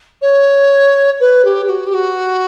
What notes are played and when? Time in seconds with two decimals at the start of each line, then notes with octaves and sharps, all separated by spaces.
0.21 C#5
1.20 B4
1.44 G4
1.65 G4
1.69 F#4
1.86 G4
1.94 F#4